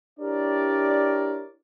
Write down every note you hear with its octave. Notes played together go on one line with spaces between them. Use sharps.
D4 E4 G4 A#4 C#5 D5